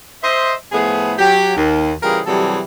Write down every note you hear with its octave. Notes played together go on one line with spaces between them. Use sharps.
C5 D#5 E5
A2 F3 A3 B3 G#4
F#3 G4
D#2
C#3 E3 G3 F4 G#4 A#4
C3 E3 F#3 G3 G#4 A4